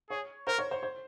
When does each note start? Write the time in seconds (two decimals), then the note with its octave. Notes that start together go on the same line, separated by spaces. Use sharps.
0.10 G#4 C#5
0.47 A#4 C5
0.58 C#5
0.71 C5
0.83 C5